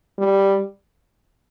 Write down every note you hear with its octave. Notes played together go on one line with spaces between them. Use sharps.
G3